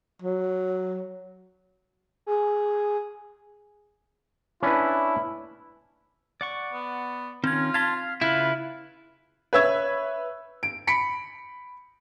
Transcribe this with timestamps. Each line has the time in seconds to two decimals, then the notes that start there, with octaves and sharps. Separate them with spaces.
0.22 F#3
2.26 G#4
4.63 C#4 D4 E4 B4
6.41 D5 F#5 C#6
6.73 B3
7.44 D#3 C4 C#4 F4 G#6
7.74 F5 A5 C6 G#6 B6
7.97 F5
8.21 C#3 E4 F4 B4 F5
9.53 B4 C#5 E5 E6 G#6
10.63 D7
10.87 B5 B6 C#7 D7